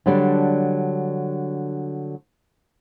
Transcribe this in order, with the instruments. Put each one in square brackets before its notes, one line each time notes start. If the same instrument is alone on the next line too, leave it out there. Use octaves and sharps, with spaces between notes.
[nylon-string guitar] D3 F#3 G3 D4